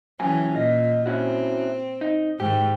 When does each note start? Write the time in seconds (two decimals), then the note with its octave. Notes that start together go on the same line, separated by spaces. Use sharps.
0.20 C#3 E3 F#3 C#4 G#5
0.54 A#2 F4 D#5
1.06 C4 C#4 E4 F#4
2.01 D#4
2.40 G#2 D#3 G4